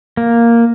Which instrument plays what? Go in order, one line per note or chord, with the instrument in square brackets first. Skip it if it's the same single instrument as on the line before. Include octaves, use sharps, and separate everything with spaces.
[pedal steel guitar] A#3